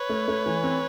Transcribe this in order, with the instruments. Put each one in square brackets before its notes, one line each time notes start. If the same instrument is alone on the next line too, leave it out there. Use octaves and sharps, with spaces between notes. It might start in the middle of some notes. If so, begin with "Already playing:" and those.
Already playing: [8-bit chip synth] B4 C#5
[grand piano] A3
A3
E3
C4